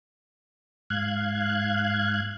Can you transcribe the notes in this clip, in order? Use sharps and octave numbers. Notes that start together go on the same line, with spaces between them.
G#2 F5 F#6 G#6